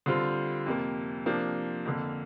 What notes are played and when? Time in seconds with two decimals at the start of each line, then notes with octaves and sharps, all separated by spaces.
0.06 D3 G3 C4 F4
0.66 F2 C3 A#3
1.26 C3 F3 A#3 D4
1.86 F2 D3 A#3